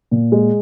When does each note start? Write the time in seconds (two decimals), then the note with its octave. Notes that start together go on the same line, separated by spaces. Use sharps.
0.11 A#2
0.32 G#3